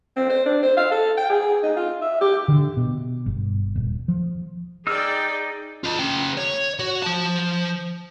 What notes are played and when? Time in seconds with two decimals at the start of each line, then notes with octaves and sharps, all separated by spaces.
0.17 C4
0.30 C5
0.46 D4
0.63 C5
0.77 F5
0.92 A4
1.17 G5
1.30 G#4
1.63 D#4
1.76 F4
2.02 E5
2.21 G4
2.48 D3
2.77 B2
3.26 G1
3.75 D#1
4.08 F3
4.87 D#4 G#4 D5 G5 E6 F6
5.84 F4 D#5
5.99 C#3 G5
6.37 C#5
6.79 F#4
7.03 F3 A5